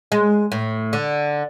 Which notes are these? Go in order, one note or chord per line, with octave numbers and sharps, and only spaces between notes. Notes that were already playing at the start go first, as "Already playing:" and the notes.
G#3
A2
D3